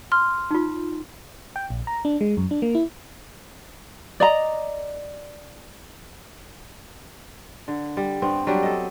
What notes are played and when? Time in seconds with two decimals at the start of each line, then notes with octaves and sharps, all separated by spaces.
0.12 C6 F6
0.51 D#4 F4
1.56 G5
1.70 A#1
1.87 A#5
2.05 D4
2.21 G#3
2.37 F#2
2.51 D4
2.62 A#3
2.75 E4
4.20 D5 D#5 A#5
7.68 D3
7.97 G3
8.22 G2 B3 C4
8.47 F#3 G3 D4 G4
8.63 A4 D#5